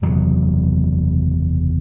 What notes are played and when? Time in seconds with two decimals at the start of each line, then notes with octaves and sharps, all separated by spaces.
0.02 F#1 E2 C3 F#3